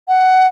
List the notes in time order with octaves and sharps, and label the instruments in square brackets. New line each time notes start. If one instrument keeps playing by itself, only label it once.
[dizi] F#5